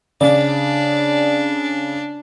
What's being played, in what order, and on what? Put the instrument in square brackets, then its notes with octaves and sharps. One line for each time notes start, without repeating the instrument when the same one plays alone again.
[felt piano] C#3 [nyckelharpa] D4 [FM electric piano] D5